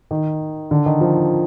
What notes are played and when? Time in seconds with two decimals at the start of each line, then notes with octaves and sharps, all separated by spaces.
0.11 D#3
0.71 D3
0.86 D#3
1.01 F3